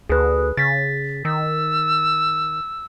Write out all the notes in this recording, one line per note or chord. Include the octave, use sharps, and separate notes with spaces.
D2 G#4 B4
C#3 A6 B6
D#3 E6